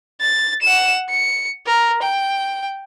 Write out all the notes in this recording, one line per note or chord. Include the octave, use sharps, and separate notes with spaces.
A6
F#5 E7
C#7
A#4
G5